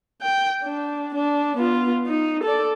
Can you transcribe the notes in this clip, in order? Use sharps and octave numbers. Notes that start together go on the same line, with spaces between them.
G5
D4
D4
B3 F4
D#4
A4 D5